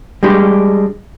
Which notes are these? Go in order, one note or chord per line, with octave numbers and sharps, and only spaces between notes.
G3 G#3 D4 G4